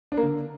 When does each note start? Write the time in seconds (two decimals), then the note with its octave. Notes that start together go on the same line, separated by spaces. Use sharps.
0.12 D4
0.17 A#3
0.23 D3